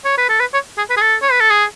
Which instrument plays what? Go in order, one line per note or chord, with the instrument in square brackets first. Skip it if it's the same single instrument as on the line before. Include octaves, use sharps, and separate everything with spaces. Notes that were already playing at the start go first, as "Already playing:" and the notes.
[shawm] C#5
B4
A4
B4
C#5
G#4
B4
G#4
A4
C#5
B4
A4
G#4